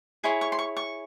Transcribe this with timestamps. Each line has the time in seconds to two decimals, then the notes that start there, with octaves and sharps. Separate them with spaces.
0.24 E4 G#4 C#5 C6
0.41 C#6
0.52 C6
0.59 C#6
0.77 C#6